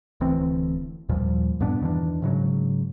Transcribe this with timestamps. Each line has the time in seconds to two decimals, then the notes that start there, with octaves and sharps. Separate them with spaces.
0.21 D1 D2 E3 C4
1.09 D#2 A#2 F3 G3
1.60 G2 A#2 B3 D4
1.81 E2 D#3 E3 D4
2.22 G#2 C#3 F#3